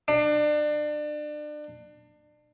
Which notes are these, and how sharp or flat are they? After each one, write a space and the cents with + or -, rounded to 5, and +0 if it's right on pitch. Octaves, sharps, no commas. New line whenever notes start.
D4 +30